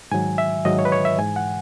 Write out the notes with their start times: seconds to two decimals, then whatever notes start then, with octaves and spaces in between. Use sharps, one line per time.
0.12 G#2 D#3 F#3 G#5
0.38 E5
0.65 G#2 D#3 F#3 D#5
0.79 C#5
0.85 B4
0.92 C#5
1.05 E5
1.18 G#2 E3 G#5
1.36 F#5